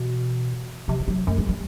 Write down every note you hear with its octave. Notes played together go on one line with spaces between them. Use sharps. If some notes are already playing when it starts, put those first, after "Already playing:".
Already playing: B2 E3
C3 F3
G3
F#3
F#2 A3
G#3
G3